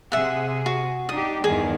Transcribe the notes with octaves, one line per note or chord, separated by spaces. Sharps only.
C3 G#4 E5 F#5
F#4
D4 D#4 G4 D#6
E2 G2 D#3 G#4